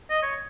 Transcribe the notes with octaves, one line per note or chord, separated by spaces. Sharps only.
D#5
C#5